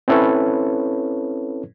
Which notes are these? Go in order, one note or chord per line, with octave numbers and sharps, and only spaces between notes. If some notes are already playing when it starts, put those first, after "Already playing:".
C4 C#4 E4 A4 B4 C#5